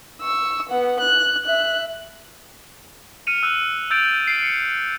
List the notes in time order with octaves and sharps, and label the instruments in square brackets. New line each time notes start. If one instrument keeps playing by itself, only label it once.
[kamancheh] C#6 E6
B3 F#5
F#6
E5 F#6
[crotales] F6 C#7 D#7 F7
E6 F#6 D#7
E6 G6 A6 D7 F7
C7 D7
C#7